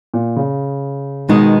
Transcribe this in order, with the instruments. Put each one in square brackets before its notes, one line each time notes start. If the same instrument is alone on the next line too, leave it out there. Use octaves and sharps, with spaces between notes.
[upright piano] A#2
C#3
[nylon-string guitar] B2 G#3 B3 D#4 [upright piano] D#3